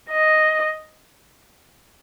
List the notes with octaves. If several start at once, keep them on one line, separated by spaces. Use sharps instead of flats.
D#5